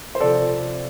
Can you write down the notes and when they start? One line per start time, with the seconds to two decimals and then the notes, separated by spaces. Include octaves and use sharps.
0.15 C5
0.20 C3 F3 A4 D5